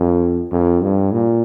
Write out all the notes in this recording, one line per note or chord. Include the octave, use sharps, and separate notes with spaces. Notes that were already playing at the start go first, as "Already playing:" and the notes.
Already playing: F2
F2
G2
A#2